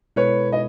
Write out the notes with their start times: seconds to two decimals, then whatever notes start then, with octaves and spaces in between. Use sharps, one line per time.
0.16 B2 G#3 B3 E4 A4 B4 C#5
0.52 D#5